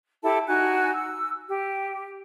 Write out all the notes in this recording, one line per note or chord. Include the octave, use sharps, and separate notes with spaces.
E4 G4 A4 A5
D#4 F#4 G#5 F#6
E6
G4